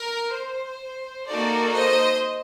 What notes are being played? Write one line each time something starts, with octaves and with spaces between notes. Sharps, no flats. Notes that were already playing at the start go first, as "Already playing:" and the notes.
Already playing: A#4
C5
A#3 D#4 F#4 A4 A#4 D5
C5 D#5